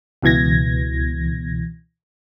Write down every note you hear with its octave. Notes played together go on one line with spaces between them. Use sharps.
C#2 B2 E3 G#6 A#6